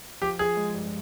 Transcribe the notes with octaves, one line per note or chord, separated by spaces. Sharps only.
F3 G4
F3 G#4
G#3
G2